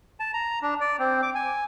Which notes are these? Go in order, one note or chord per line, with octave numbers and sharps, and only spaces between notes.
A5
A#5
D4
D5
C4
D6
G#5